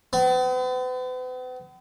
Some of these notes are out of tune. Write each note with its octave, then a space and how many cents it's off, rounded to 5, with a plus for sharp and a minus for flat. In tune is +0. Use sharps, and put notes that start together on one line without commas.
B3 +45